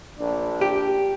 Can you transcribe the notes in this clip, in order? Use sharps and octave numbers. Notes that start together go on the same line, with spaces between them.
A#1 D4
G4